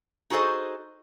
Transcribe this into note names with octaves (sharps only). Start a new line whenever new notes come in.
D#4 F#4 G#4 A4 C5 D#5